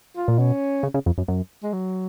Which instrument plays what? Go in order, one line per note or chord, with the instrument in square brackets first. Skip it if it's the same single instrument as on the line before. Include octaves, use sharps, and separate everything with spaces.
[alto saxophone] F4
[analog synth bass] A#2
[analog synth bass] B2 [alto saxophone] C#4
[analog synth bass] C#3
C#3
F2
F#2
F#2
[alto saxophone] G#3
F#3